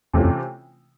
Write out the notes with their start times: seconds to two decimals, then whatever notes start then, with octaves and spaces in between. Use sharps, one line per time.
0.14 E2 C3 E3 A3 C#4 F4
0.24 F2